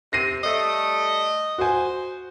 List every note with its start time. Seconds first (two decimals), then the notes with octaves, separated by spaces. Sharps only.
0.13 C3 A#6 C7 D#7
0.43 G3 A3 D#5
1.58 F#4 C5 G#5